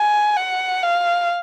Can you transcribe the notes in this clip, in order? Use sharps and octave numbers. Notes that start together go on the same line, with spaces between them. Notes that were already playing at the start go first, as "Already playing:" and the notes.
Already playing: G#5
F#5
F5